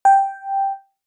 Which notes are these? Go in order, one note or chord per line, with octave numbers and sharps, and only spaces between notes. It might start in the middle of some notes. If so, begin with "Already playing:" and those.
G5